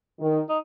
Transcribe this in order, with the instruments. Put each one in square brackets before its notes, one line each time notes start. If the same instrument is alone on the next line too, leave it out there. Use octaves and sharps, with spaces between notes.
[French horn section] D#3
[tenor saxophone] D#4